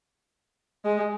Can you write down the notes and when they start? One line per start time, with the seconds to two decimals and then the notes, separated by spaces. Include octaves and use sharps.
0.85 G#3